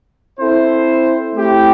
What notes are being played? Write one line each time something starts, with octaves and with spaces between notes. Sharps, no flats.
C4 E4 A4 C5
A3 C4 E4 G4